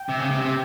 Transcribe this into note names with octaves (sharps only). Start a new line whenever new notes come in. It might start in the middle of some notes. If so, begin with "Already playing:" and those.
Already playing: G5
C3
C#3
C3
C3